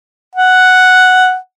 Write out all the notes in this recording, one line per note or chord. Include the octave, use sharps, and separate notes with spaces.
F#5